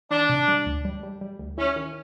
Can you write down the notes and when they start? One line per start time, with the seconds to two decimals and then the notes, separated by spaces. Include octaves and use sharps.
0.11 D#3 D4
0.29 C3
0.48 G3
0.66 D2
0.85 G3
1.03 G3
1.21 G3
1.39 D2
1.58 C#4 E4
1.76 D#3